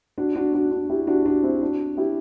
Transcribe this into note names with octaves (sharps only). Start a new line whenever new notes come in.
D4 F#4
D4 F#4
D4 F#4
D4 F#4
E4 G4
D4 F#4
D4 F#4
C4 E4
D4 F#4
E4 G4